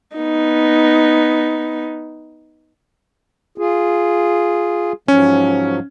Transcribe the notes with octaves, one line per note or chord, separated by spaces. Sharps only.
B3 D#4
F4 G#4
G#2 F3 F#3 C#4